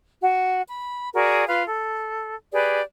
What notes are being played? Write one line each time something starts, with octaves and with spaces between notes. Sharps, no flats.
F#4
B5
F#4 G#4 A#4 D5
F4 B4 F5
A4
G4 G#4 B4 D5